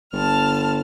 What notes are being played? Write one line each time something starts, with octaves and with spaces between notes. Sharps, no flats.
G1 A5 F6